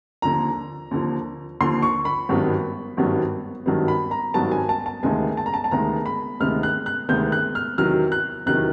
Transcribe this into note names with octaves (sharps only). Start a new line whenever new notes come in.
D#2 D3 F3 A#5
D#2 D3 F3
D#2 D3 F3 C6
C#6
B5
G#1 G2 D#3 F#3 B3
G#1 G2 D#3 F#3 B3
G#1 G2 D#3 F#3 B3
B5
A#5
G#1 G2 D#3 F#3 B3 A5
G#5
A5
A5
D2 C3 D#3 G#3 B3 G#5
A5
A#5
A5
A5
D2 C3 D#3 G#3 B3 A#5
B5
D2 C3 D#3 G#3 B3 F6
F#6
F#6
D2 C3 D#3 G#3 B3 G6
F#6
F6
E2 C3 D#3 F#3 F6
F#6
E2 C3 D#3 F#3 F#6